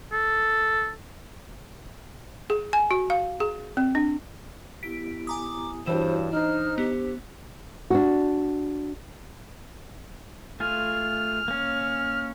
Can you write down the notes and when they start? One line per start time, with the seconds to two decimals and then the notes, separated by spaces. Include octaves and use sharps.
0.12 A4
2.50 G#4
2.73 G#5
2.91 F#4
3.10 F5
3.40 G#4
3.77 C4
3.95 D4
4.83 B3 E4 G4 B6 D7
5.27 G#5 A#5 D6 D#6
5.86 G2 E3 E4 F#4 C5 C#5 E7
6.33 D4 D#4 C5 F6
6.78 B3 G4
7.90 D4 F#4
10.60 A3 F4 G#4 F6
11.48 A#3 C#4